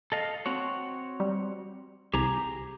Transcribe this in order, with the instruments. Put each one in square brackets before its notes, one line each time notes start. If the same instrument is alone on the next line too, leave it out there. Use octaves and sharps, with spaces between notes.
[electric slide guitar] A4 D#5 F5
C4 F#4 C#5
[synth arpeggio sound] G3
[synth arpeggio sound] C2 [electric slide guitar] G4 G#4 A#5